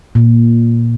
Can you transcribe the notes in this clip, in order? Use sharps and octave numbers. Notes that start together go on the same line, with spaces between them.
A#2